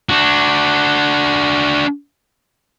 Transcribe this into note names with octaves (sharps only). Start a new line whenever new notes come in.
D4 F#4